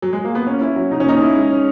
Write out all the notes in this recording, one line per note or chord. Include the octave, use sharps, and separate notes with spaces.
F#3
G#3
A#3
B3
A#3 C#4
E4
F#3
C#3 D#4
C#4
A#3 D#4
E4
G#3
C#4